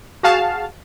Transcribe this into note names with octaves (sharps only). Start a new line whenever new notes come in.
F#4 G#4 F5 A5